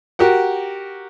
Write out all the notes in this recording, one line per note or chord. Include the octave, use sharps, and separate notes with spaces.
F#4 G4 A#4 F#5